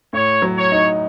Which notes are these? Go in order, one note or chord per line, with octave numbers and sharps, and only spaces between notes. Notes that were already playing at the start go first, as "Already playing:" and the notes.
A2 C#5
F#3
C#5
D#4